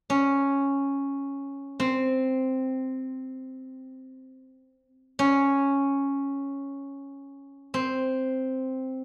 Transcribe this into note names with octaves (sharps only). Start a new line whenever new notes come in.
C#4
C4
C#4
C4